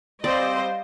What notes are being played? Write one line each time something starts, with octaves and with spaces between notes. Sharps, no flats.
G3 C4 C5 D5 D#5 F5